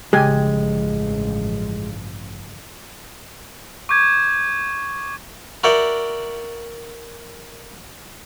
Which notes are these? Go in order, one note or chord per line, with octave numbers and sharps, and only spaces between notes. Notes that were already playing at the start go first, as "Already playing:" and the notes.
A1 G2 C#3 F3 G#3 G4 G#5
C#6 D6 G6 G#6
F#4 A#4 D5 E5 F#5 G5